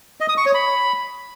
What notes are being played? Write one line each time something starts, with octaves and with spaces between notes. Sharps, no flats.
D#5
D#6
C#6
C#5
B5